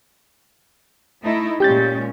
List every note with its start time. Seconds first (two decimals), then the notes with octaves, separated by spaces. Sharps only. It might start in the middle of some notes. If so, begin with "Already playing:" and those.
1.22 A3 D#4 E4
1.60 A#2 G#3 C#4 G4 G6 A6